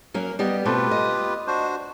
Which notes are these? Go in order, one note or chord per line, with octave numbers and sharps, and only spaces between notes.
F#3 A#3 C#4 A#4
G3 B3 G4 D#5
B2 A3 C4 F4 G4 B4
D#5
D4 F#4 C5